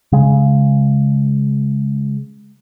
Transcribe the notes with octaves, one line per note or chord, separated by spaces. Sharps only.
C#3 G#3